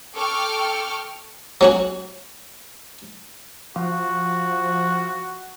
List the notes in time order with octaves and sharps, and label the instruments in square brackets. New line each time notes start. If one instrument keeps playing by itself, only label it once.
[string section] A4 G5 C#6 D6 F6
[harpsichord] F#3 C#4 F#4
[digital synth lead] F3 [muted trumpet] F#4